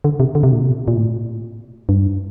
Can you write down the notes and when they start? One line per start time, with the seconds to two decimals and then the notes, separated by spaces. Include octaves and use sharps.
0.04 D3
0.20 C3
0.35 D3
0.43 C3
0.52 A#2
0.61 C3
0.88 A#2
0.96 A2
1.89 G2